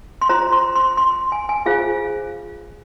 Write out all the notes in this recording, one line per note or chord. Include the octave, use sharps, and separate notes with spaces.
C6
F4 C5 A#5
C6
C6
C6
G#5
G#5
F4 G#4 C5 F5